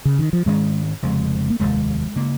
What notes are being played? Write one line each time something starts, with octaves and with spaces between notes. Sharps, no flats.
C#3
D#3
F3
G#2 D#3 G#3 C#4
F1 F2 C#3 G#3
A#3
F1 D#2 D#3 G#3
C#3 A#3